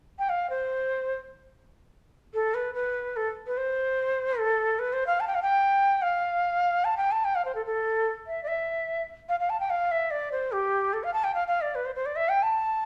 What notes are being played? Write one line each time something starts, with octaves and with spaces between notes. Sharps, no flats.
G5
F5
C5
A4
B4
B4
A4
B4
C5
A4
B4
C5
F5
A5
G5
F5
G5
F5
A5
G5
A5
G5
F5
C5
A4
A4
E5
D5
E5
F5
F5
A5
G5
F5
E5
D5
C5
G4
A4
F5
A5
G5
F5
F5
D5
B4
C5
C5
D5
E5
G5
A5